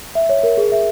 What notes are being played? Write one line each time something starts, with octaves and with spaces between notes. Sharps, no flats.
E5
C#5
A#4
G#4
E5